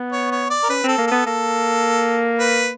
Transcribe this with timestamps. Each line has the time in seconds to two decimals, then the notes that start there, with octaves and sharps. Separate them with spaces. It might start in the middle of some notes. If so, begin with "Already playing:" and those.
Already playing: B3
0.12 C#5
0.31 C#5
0.50 D5
0.63 A#4
0.69 C#4 B4
0.84 C4 A4
0.98 A#3
1.07 B3 A4
1.26 A#3 A4
2.39 B4